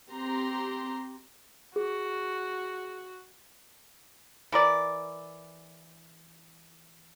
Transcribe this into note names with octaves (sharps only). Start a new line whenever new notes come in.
C4 G4 A#5 C6
F#4 G#4
E3 A#4 D5